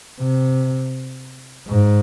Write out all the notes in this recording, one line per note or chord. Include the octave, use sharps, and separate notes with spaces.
C3
G#2